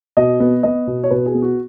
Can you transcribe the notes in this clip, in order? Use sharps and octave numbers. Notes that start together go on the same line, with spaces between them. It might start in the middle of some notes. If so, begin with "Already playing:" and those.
B2 D#5
B3
B3 D#5
B2
C#5
B2 B4
G#4
B3
F#4